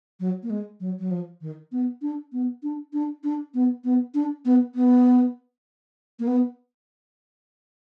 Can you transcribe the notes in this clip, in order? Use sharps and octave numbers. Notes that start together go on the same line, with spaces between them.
F#3
A#3
G#3
F#3
F#3
F3
D#3
B3
D4
B3
D4
D4
D4
B3
B3
D4
B3
B3
A#3
B3